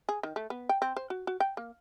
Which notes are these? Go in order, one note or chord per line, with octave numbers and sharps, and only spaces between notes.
G#4
D#3
A3
B3
G5
C4
C5
F#4
F#4
G5
A#3